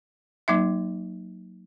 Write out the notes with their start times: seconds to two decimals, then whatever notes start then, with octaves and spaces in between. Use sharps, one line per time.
0.48 F#3 A#3 D#4 E5